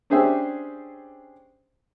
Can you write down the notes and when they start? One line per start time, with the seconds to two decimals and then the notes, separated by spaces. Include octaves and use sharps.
0.10 C#4 D4 G4 G#4 C5 E5